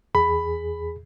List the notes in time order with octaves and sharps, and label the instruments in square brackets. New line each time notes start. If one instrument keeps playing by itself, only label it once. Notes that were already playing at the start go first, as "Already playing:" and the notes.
[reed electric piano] E2 G#4 [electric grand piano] B5